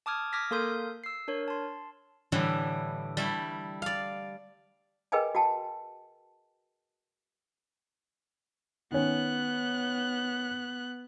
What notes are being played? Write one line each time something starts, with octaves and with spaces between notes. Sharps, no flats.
A5 D6 D#6 F6 G#6
D6 D#6 F6 G#6 A#6 B6
A#3 A4 A#4 C6 D#6 G6
E6 C7
D4 A#4 C#5
A5 C6
A2 D3 E3 G3 A3
G3 A3 E4
D5 F5
G#4 A#4 B4 D#5 G5 G#5
F#4 G5 A5
D#3 B3 C#4 F#6